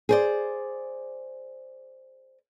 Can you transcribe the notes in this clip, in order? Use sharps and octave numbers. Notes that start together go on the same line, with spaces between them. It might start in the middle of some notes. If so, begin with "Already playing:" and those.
G#4 C5 D5